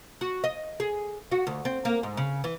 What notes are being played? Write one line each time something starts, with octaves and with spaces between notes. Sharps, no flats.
F#4
D#5
G#4
F#4
D2
C4
A#3
G#2
C#3
E3